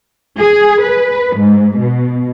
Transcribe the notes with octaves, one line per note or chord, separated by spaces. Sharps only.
G#4
B4
G#2
B2